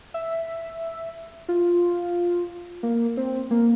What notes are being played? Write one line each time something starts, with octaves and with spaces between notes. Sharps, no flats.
E5
F4
A#3
C4
A#3